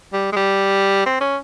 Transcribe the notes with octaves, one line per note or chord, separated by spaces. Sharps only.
G3
G#3
G3
C4
C#4